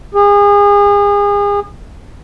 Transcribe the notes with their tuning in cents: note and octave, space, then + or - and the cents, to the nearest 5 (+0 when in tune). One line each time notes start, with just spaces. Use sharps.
G#4 -35